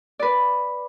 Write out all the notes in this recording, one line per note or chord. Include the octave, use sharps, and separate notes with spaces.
B4 D5